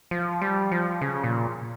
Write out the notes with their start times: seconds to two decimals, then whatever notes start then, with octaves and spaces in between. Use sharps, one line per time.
0.11 F3
0.42 G3
0.72 F3
1.01 C#3
1.24 A#2